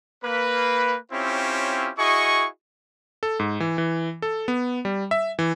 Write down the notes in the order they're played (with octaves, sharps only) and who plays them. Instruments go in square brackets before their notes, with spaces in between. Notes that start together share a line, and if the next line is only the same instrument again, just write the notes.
[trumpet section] A#3 B4
C4 C#4 E4 F4 G4 C#5
E4 F#4 G#4 D#5 C#6
[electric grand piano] A4
G#2
E3
E3
A4
B3
G3
E5
E3